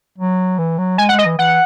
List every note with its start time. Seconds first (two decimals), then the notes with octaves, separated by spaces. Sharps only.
0.18 F#3
0.58 E3
0.78 F#3
0.98 G#3 G#5
1.09 F#5
1.11 G#3
1.19 D#5
1.26 E3
1.38 E3 F#5